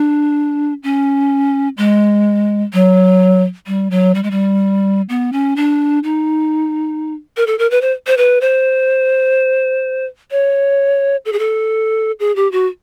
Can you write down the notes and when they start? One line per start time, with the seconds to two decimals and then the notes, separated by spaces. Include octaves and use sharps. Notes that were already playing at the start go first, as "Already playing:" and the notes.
Already playing: D4
0.83 C#4
1.78 G#3
2.73 F#3
3.67 G3
3.91 F#3
4.15 G3
4.23 G#3
4.31 G3
5.09 B3
5.33 C#4
5.57 D4
6.04 D#4
7.37 A#4
7.47 A4
7.59 A#4
7.71 B4
7.81 C5
8.07 C5
8.17 B4
8.41 C5
10.31 C#5
11.25 A4
11.33 G#4
11.39 A4
12.20 G#4
12.36 G4
12.52 F#4